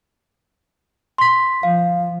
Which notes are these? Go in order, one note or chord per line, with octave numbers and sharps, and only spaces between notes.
C6 B6
F3 F5